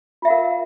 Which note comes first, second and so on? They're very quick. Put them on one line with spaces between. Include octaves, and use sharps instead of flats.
F4 E5 F5 A#4